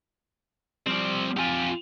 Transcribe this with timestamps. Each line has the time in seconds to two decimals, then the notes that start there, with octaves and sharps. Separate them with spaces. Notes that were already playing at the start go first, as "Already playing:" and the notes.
0.86 F3 G3 C4 D5
1.37 F2 C4 F4 G4 G#5